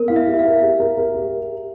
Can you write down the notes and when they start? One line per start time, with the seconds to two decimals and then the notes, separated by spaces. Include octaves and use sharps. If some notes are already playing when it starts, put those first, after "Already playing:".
Already playing: B3 A#4
0.08 E4 F5
0.16 E5
0.27 G4
0.34 E5
0.39 F5
0.45 A#4
0.62 G4
0.80 A#4
0.97 A#4
1.14 G4